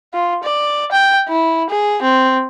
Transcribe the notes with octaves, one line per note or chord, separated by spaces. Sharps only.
F4
D5
G5
E4
G#4
C4